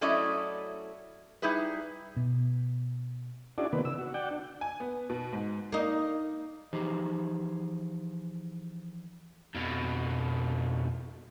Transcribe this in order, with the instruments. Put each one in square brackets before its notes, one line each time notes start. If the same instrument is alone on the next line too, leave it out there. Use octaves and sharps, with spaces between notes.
[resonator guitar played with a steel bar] F#3 A3 C#4 E4 D5 D#5
G3 D#4 E4 G#4 B4
[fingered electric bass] B2
[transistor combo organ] C#4 D4 E4 F#4 G#4 D5
C3 D#3 A#3 B3 B4
C#3 E6
F#4
D5 F#5 G5
D4
[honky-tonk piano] G#5
B3
B2
G#2
[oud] A#3 D#4
[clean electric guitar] E3 F3 D#4 G4 G#4 C5
[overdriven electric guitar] F2 B2